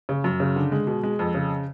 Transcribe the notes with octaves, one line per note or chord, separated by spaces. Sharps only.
C#3
F#2
C#3
D3
G#3
B2
G#3
F2
C#3